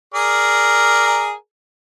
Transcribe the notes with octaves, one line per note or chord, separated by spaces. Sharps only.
G#4 A#4 D5